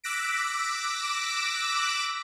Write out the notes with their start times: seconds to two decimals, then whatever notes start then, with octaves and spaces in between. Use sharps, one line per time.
0.04 D6 E6 F#6 A#6 B6 D7